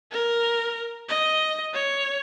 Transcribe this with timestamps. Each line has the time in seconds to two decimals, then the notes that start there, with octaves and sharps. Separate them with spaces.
0.12 A#4
1.09 D#5
1.74 C#5